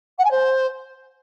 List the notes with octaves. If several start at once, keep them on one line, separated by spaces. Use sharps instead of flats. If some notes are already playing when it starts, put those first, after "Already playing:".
F#5
G#5
C5